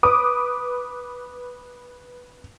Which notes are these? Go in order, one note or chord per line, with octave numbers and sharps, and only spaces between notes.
B4 D6 D#6